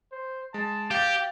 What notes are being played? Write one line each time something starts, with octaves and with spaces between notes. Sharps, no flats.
C5
G#3 A5
G4 F5 G5 A6